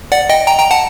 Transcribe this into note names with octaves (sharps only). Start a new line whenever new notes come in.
D5 F#5
D#5 G5
G5 A#5
G5 A#5
F#5 A5